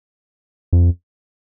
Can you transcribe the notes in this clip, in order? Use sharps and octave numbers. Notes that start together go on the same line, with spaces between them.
F2